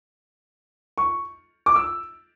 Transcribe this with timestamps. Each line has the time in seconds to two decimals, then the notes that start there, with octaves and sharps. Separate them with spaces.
0.98 C#6
1.66 D6
1.76 E6